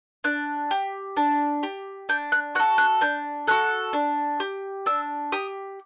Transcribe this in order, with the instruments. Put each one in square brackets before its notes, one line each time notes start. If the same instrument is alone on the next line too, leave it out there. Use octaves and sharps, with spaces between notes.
[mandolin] D4 F#6
G4
D4
G4
D4 G6
F#6
F#4 F#6
A4
F#6
D4 G6
F#4 A4 F#6
D4
G4
D4 E6
G4 D#6